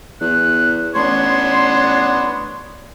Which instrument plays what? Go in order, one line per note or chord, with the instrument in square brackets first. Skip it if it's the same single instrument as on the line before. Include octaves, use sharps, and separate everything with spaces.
[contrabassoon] E2 [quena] F#6
[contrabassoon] A1 [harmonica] B3 D4 C#5 [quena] C6